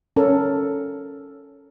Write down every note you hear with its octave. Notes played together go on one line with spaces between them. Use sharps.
C#4 A4 A#4